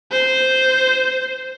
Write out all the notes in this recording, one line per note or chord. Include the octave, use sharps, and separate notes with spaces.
C5